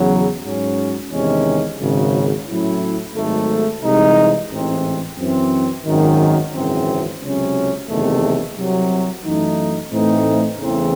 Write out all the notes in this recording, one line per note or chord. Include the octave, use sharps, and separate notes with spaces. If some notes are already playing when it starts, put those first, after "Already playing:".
Already playing: E2 C#3 F#3
G#2 F#3 C#4
E2 C3 D#3 G#3 C#4
G#1 F#2 C#3
A2 F#3 C#4 E4
G#1 G#2 F#3 A3
C2 C3 E3 G#3 D#4
A1 G#2 E3 C4
F#2 E3 C4
G#1 F#2 D#3
G#1 F#2 C#3 E3 C4
C#2 C3 F#3 C#4
F#1 E2 C3 D#3 A3
C2 C3 F#3
F#2 E3 A3 D#4
A2 E3 A3 C4 D#4
E2 C#3 E3 A3 C4